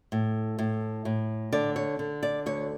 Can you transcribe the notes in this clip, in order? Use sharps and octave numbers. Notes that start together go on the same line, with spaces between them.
A2
A2
A2
D3 D5
C#5
D3
D5
D2 C#5